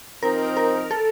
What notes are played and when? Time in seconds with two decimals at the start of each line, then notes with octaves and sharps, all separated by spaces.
0.23 F3 C4 D#4 A#4
0.57 A#4
0.91 A4